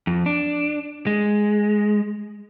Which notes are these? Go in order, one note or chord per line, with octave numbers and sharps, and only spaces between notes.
F2
D4
G#3